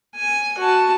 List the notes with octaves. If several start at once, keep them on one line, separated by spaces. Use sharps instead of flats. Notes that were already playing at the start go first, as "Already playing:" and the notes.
G#5
F#4 A5